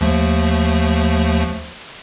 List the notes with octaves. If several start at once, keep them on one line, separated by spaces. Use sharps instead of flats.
D#2 F3 A3